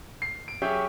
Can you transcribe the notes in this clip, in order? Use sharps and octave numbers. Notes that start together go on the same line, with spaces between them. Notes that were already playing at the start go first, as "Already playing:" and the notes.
C7
D7
F#3 C#4 G4 G#4 E5 G6